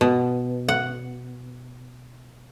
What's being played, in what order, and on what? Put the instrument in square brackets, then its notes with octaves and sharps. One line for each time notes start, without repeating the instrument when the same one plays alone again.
[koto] B2
F#5